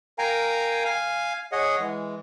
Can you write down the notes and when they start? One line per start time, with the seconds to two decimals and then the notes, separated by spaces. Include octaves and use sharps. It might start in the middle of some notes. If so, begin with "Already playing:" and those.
0.19 A#4 F5 G5 G#5 A#5
0.85 F5 G#5
1.52 G#4 C#5 D#5 F#5
1.79 E3 G#3